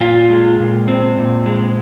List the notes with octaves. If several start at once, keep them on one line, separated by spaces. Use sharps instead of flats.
A#2 F4
G#3
A#2
C4
A#2
G#3